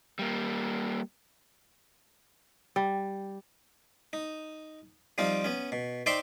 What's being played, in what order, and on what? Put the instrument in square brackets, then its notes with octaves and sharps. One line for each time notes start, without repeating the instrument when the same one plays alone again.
[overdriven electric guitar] G3 A#3
[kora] G3
[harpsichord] D#4
F3 G3 C4 D#4 F4
B3 C#4
B2
D#4 C5 D5 E5 G5 C6